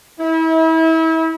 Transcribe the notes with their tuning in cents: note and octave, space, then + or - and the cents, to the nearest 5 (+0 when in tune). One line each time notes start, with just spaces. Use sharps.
E4 -35